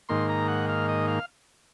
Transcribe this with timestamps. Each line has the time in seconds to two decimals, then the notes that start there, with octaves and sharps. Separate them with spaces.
0.09 G#2 D#3 A#3 C6
0.29 A#5
0.48 F#5
0.69 F5
0.88 D#5
1.08 F5